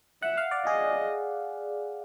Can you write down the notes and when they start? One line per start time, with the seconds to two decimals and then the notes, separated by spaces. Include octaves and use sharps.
0.22 E5 F#5
0.37 F5
0.51 D5
0.66 G#4 D#5